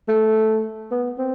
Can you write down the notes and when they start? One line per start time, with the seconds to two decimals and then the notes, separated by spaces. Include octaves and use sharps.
0.08 A3
0.91 B3
1.18 C4